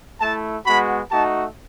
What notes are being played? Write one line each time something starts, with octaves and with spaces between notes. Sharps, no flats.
A3 E4 A5
G#3 B3 F#4 B5
A3 D#4 F#4 A5